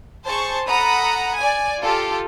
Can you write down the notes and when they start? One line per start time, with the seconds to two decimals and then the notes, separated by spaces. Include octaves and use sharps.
0.25 G#4 C5 A5 C#6
0.67 A4 F#5 A#5 B5 D#6
1.37 D5 G#5
1.82 F4 G4 A4